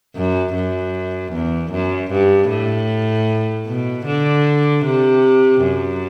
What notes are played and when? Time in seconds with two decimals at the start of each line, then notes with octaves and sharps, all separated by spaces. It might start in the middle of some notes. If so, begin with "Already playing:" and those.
0.15 F#2
0.54 F#2
1.33 E2
1.72 F#2
2.11 G2
2.50 A2
3.67 B2
4.06 D3
4.85 C3
5.63 F#2